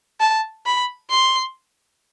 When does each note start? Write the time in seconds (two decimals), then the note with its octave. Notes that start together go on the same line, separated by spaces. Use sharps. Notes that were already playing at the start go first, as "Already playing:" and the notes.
0.20 A5
0.66 B5
1.10 C6